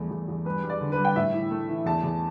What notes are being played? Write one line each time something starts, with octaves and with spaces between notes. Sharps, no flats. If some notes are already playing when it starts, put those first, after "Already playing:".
Already playing: E2 G2 A3
E2
E2
G2 B4
G3
D5
D3
B4
G3
G5
A2 E5
E3
A3
E3
E2 A5
E2